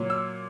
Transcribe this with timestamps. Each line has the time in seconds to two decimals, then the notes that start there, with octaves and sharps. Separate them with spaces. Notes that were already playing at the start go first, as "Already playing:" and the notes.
Already playing: A#2 F#3
0.10 E6